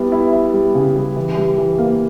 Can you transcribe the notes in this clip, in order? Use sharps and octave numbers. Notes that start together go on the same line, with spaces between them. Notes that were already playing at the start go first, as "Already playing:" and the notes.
Already playing: G3 B3 E4
E4
E4
G3
C#3
G3
E3
G3
E3
A#3